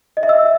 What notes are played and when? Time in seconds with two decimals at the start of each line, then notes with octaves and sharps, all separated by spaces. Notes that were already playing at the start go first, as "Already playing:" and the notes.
0.17 D#5
0.23 E5
0.29 E6